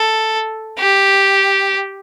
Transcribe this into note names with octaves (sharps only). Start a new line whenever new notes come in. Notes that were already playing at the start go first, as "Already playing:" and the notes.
Already playing: A4
G4